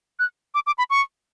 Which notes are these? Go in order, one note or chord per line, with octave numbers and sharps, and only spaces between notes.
F#6
D6
D6
B5
C#6